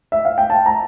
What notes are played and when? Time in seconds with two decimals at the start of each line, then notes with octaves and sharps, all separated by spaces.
0.12 E5
0.25 F5
0.38 G5
0.50 A5
0.66 A#5